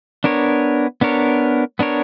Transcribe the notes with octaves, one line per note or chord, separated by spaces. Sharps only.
B3 D4 A#4 C#5
B3 D4 A#4 C#5
B3 D4 A#4 C#5